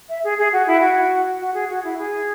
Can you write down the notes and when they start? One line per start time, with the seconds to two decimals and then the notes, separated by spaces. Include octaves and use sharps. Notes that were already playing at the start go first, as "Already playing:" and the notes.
0.09 E5
0.24 G#4
0.38 G#4
0.52 F#4
0.67 E4
0.81 F#4
1.40 F#4
1.54 G#4
1.69 F#4
1.84 E4
1.98 G#4